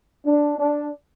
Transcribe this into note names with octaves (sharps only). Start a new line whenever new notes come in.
D4
D4